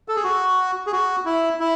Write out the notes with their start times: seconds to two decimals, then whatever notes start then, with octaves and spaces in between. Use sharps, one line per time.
0.08 A4
0.16 G#4
0.24 F#4
0.87 G#4
0.92 F#4
1.26 E4
1.60 E4